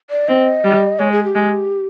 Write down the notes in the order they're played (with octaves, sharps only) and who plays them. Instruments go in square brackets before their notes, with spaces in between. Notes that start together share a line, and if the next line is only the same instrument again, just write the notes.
[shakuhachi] D5
[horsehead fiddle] C4 [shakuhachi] D#5
[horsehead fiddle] G3
[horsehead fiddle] G#3 [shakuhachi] C#5
[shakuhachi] G#4
G4
[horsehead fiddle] G#3